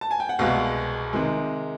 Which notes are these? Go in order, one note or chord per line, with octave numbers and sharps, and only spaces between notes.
A5
G#5
G5
F#5
C2 B2 G#3 F5
C3 D#3 G#3